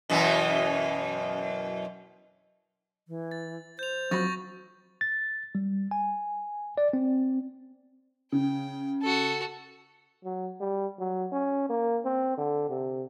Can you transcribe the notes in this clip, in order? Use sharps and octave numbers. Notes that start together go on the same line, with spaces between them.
F#2 B2 E3
E3
A6
C5 G6 F7
F2 F#3 B5 C#6 A6 A#6
A6
G3
G#5
D5
C4
C#3 G5
F#4 A4
F#3
G3
F#3
C#4
A#3
C4
D3
C3